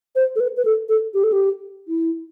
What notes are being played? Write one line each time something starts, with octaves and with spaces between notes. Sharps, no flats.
C5
A4
B4
B4
A4
A4
G4
A4
G4
E4